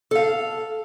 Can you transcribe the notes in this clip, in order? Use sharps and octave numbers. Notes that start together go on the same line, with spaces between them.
A4 F5